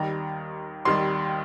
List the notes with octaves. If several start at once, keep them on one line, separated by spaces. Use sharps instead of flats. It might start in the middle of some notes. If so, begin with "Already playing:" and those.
Already playing: D#2 D#3 G3 A#5
D#2 D#3 G3 C6